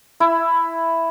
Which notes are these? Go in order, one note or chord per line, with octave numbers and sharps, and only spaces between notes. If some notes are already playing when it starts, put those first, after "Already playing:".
E4